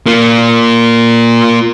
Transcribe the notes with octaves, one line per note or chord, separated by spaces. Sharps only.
A#3 F4